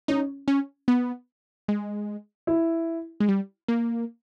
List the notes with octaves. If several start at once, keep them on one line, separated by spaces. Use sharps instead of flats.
C#4 D#4
C#4
B3
G#3
E4
G#3
G3
A#3